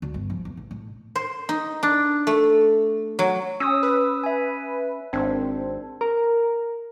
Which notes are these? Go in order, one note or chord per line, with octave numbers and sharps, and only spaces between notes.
D2
G1
F3
E2
A1
A2
C5
D#4
D4
A3
F#3
C#4 D#6 E6
B4
E5 G#5
G#1 C4 D4
A#4